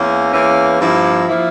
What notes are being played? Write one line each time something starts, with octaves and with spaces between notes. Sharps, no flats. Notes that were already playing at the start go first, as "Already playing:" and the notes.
Already playing: E2 E3 A#3 C#4
E2 E3 A#3 C#4
G2 F3 A#3 E4
F3 A#3 E4